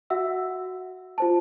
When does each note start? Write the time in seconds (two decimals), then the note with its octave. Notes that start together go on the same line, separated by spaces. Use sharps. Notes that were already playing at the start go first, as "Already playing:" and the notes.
0.10 F#4 E5 F#5 E6
1.18 F4 C5 A5